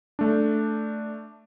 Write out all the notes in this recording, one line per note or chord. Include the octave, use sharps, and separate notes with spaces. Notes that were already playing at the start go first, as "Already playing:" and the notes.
A3 D4